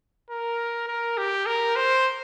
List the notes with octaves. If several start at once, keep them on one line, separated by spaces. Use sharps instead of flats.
A#4
A#4
G4
A#4
C5